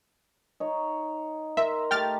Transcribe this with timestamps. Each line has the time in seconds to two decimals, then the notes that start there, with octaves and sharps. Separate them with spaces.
0.60 D#4 C#5
1.57 A#4 E5 A#5 C6
1.91 A3 G4 G5 A#5 F6 A6